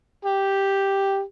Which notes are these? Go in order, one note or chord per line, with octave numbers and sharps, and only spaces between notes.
G4